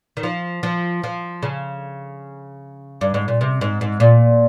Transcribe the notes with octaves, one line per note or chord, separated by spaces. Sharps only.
D#3
F3
F3
F3
C#3
G2
G#2
A#2
C3
G#2
G#2
A#2